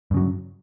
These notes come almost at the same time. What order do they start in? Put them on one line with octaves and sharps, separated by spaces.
G2 C#3 F#3